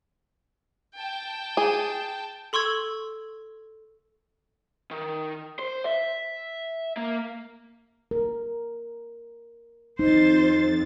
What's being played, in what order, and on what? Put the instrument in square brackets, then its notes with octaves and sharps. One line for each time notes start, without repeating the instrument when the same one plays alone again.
[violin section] G5 A5
[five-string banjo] G#4
[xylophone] A4 C6 C#6 E6 G#6
[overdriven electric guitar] D#3
C5
E5
A#3
[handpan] A#4
[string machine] F2 A6 [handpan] D#4 [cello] C5